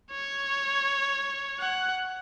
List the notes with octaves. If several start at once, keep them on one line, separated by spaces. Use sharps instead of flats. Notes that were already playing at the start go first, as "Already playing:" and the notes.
C#5
F#5